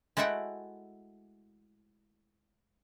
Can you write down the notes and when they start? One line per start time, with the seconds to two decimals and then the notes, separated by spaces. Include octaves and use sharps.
0.17 G#3 A3 E4 F#4 F#5 G5